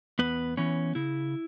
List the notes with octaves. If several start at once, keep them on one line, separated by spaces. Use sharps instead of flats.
E2 B3 B4
E3 B3 C#4 C#5
C#3 E4